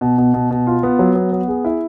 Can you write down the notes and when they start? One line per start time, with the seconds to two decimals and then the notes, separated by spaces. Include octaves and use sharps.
0.01 B2
0.18 B2
0.34 B2
0.51 B2
0.67 F4
0.83 B3
0.99 F#3
1.15 B3
1.32 B3
1.48 G#4
1.65 E4